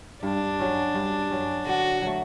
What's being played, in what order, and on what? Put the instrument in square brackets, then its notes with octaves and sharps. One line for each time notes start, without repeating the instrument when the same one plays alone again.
[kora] G2 [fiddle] D4
[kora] F#3 C#4
G2
F#3 C#4
[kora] D3 [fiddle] F#4
[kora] F#3 A3